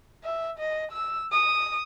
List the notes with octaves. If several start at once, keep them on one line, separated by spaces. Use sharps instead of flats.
E5
D#5
E6
D#6